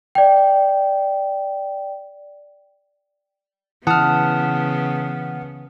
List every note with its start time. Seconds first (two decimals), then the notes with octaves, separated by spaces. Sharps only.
0.15 D5 G5
3.87 C#3 E3 B3 F#5 A5 D#6 F6